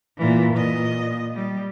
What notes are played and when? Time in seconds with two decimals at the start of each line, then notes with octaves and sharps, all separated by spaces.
0.18 A#2 E3
0.54 A#2 D#5
1.35 G3